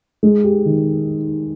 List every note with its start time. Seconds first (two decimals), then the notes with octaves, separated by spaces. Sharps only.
0.23 G#3
0.44 G4
0.66 D#3